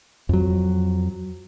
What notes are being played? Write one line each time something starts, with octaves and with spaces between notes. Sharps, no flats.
F2 F#3